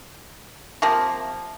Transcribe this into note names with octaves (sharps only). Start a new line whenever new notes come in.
C3 F3 A#3